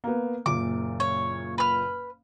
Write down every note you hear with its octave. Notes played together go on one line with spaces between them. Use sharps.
A#3 B3
F#1 A#2 D6
C#5
B4 F6